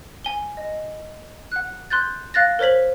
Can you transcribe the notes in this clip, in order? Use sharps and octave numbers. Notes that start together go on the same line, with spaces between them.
G#5 G7
D#5
F#5 F#6
C6 F#6 G6 A6
F5 F#6 A6 A#6
A#4 C5 C#5 B6 F#7